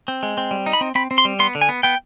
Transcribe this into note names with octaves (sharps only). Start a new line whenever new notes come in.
C4
G#3
C4
G3
D#4
B5
C4
C4 B5
C4
C6
G3
B3 C6
D3
G#5
B3
B3 G5